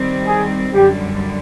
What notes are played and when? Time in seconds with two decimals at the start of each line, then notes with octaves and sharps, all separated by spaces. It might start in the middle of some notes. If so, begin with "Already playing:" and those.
Already playing: D#3 G3 C4
0.27 G#4
0.73 F#2 D3 G3 G4